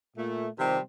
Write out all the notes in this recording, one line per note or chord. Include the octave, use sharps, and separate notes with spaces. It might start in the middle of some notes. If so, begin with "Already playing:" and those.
A#2 A3
C3 D#3 F3 G3 C4